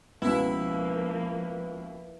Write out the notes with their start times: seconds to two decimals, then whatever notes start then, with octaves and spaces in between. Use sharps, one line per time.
0.22 C#2 B2 F3 A#3 B3 E4 B4